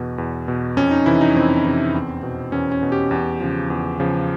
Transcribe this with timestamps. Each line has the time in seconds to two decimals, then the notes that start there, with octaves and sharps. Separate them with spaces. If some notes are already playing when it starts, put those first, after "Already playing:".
Already playing: E2 B2
0.18 E2
0.48 B2
0.77 F2 C#4
0.91 D#4
1.06 C3 E3 E4
1.21 D#4
1.35 F2 C4
1.65 C3 E3
1.94 E2
2.23 B2
2.52 E2 C#4
2.72 C#4
2.83 B2
2.92 G4
3.11 E2
3.40 C#3 F3
3.70 E2
4.00 C#3 F3